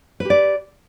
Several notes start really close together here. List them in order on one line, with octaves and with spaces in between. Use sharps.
B4 G4 D5